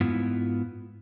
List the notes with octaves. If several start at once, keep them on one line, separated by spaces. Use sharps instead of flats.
G#2 B3 E4 F4